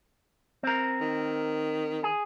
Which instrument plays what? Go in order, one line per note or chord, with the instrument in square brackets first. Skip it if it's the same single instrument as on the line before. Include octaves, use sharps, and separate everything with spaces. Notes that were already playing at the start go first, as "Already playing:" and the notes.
[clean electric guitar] C4 A#4
[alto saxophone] D#3
[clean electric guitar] G#4